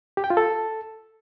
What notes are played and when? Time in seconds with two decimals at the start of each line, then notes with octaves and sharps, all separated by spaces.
0.17 G4
0.24 G5
0.30 F4
0.37 A4